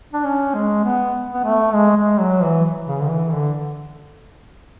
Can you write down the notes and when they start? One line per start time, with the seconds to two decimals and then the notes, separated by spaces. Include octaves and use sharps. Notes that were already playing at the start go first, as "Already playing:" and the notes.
0.13 D4
0.25 C#4
0.55 G#3
0.84 B3
1.34 B3
1.44 A3
1.74 G#3
1.97 G#3
2.20 F#3
2.42 E3
2.87 C#3
3.00 D3
3.10 E3
3.32 D3